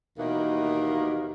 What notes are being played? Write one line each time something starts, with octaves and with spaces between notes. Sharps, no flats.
D#2 B2 D#3 E3 A#3 A#4